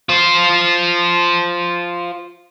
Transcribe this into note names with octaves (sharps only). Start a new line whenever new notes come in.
F4 C5